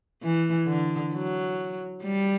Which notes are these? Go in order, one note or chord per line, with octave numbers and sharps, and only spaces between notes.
E3
D3
F#3
G3